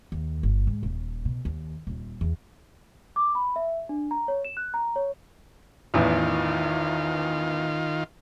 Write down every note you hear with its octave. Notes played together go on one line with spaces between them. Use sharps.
D#2
G1
G#2
D#1
B2
D#2
D#1
E2
D6
B5
E5
D4
A#5
C#5
E7
F#6
A#5
C#5
A1 E2 D#3 F4